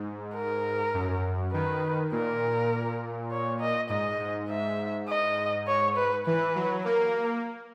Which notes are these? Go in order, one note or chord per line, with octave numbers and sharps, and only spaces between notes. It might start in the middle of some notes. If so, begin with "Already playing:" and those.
Already playing: G#2
A#4
F#2
D#3 B4
A#2 A#4
C#5
D#5
G#2 D#5
G#2
G#2 E5
D#5
C#5
B4
E3 B4
F#3
A#3 A#4